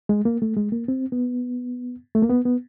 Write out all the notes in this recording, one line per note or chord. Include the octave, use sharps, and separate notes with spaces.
G#3
A#3
A3
G#3
A#3
C4
B3
A3
A#3
B3
B3